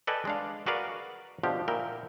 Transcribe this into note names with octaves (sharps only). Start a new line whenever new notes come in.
A4 B4 D5 D#5 G5 G#5
G#3 D4 F5
F#4 G#4 A#4 B4 D5 F5
B2 D3 F3 G4
A#2 E4 A#4 G5